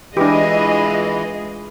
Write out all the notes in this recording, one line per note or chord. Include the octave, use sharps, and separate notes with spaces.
E3 G#3 D4 F4 G4 G#4 D#5